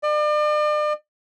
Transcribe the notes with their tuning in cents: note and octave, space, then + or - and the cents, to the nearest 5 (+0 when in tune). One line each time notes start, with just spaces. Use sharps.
D5 +40